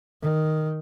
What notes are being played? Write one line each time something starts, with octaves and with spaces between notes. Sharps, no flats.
D#3